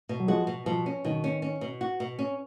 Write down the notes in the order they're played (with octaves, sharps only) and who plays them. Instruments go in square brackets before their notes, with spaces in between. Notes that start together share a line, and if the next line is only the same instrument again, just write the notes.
[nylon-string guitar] B2
[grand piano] F#3
[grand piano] F3 G#3 [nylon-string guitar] F#4
[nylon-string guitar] B2
[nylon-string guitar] B2 [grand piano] F3
[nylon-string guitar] C#4
[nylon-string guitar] B2 [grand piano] D#3
[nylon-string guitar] C#4
C#4
B2
F#4
B2
C#4